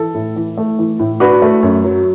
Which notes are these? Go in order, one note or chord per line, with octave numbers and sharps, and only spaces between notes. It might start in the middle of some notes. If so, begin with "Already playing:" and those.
Already playing: E3 A4
A2
E3
A3
E3
A2
D4 F#4 B4
A3
F#2
F#3